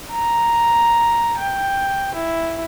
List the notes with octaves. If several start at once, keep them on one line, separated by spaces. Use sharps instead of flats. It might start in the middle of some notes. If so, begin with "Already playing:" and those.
A#5
G5
E4